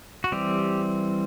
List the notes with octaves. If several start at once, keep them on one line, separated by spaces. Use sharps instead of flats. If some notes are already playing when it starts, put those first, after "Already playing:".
F#4
E3 G3 C4 G4